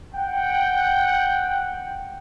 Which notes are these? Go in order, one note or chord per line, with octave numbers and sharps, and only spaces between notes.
F#5 G5